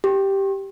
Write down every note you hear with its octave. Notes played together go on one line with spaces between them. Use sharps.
G4